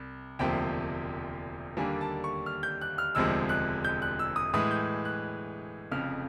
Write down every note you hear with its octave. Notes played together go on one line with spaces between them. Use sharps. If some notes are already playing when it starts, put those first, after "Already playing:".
Already playing: C2
E1 D2 C3 F3 A#3 G5
D#2 D3 G3 A#3 D4 G#5
A5
C#6
F6
G6
F#6
F6
E1 D2 C3 F3 G#3 E6
F#6
G6
F#6
E6
D#6
A2 E3 G#3 D#6
G6
F#6
F1 F2 C#3 F6